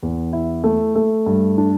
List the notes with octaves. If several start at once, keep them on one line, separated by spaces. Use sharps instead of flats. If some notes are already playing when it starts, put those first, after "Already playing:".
E2
E4
A3
A3
G2
D4